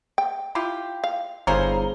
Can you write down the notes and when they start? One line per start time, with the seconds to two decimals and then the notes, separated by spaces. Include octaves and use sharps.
0.18 G5
0.55 E4 F4 G4
1.04 F5
1.47 G1 E4 G#4 A#4 C5 C#5 F5